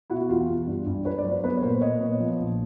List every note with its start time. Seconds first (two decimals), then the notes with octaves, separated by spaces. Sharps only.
0.10 B2 E4 F#4
0.21 F#4
0.29 E2 F4 G4
0.48 E2
0.67 G2
0.86 G2
1.05 G2 B4 C#5
1.18 C5 D5
1.24 F#3
1.31 C5 D5
1.43 B3 B4 C#5
1.57 C#5
1.62 A#2 A#4 C5
1.81 A#2 C#5 D#5
2.00 B3
2.20 F3
2.39 A#1